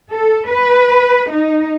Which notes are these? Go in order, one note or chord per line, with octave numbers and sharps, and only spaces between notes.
A4
B4
D#4